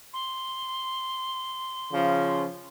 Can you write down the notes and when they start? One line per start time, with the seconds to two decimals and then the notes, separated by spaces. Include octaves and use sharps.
0.13 C6
1.92 C#3 F3